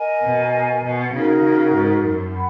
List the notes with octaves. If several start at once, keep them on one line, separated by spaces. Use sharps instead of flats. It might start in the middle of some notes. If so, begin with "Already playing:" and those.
Already playing: A#4 D#5 G#5
B2
B2
C#3 D#4 F#4 A#4
C#3
G#2
F#2
F#5 B5